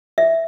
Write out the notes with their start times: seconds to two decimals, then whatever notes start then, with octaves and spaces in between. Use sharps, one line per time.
0.18 E5